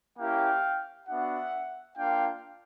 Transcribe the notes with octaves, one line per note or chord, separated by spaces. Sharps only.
A#3 C#4 E4 G4 F5 G5
B3 D4 F#4 E5 F#5
A#3 D4 F4 F5 G5